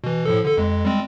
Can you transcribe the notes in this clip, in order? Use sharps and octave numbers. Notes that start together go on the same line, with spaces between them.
B2 E3
A2 F3 A4
D3 A4
F2 G#3
G3 G#3 C4